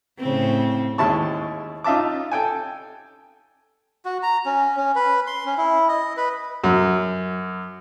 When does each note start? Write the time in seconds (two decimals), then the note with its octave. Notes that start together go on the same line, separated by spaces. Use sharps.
0.19 A2 C#3 C4
0.98 D#2 G#3 E4 A5 C#6
1.84 D#4 F4 E5 A5 D6
2.31 A4 G5 G#5
4.05 F#4
4.23 A#5
4.46 C#4
4.77 C#4
4.96 B4
5.27 C6
5.46 C#4
5.58 E4
5.88 D#5
6.17 B4
6.64 F#2